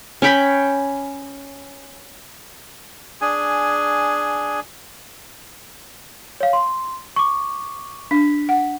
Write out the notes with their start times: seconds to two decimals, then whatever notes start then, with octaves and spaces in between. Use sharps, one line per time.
0.22 C#4 C#5 G5 B5
3.21 D4 G#4 G#5
6.40 C#5 F5
6.53 C6
7.16 C#6 D6
8.11 D4 B6
8.49 F#5